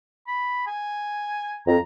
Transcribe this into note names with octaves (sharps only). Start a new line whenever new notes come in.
B5
G#5
F2 A#5